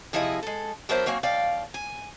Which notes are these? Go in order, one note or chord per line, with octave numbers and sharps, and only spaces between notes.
C3 F3 E4 G#4 D#5
G#3 A4
F#3 B3 D4 A#4 C5 E5
F#3 A#3 C4 C#4
D#2 D5 F5 G5
G#5